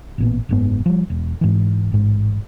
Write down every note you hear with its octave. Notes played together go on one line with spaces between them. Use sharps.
A1 A#2 B3
F#1 G#2 B3
F3 G3
E1
G#2 E3
A1 G#2